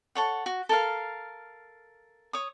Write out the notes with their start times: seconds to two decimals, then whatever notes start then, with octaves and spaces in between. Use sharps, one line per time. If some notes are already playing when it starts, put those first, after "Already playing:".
0.15 A4 C#5 F#5
0.46 F#4
0.69 A4 A#4 F5
2.33 C#5 D#6